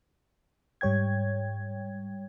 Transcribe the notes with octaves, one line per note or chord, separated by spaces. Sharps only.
G#2 G3 C#5 G5 G#6